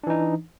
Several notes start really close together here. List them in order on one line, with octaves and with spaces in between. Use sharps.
D4 E3 D#4